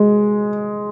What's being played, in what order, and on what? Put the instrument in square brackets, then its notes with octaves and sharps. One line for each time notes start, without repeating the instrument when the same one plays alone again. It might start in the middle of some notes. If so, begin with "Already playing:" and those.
Already playing: [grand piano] G#3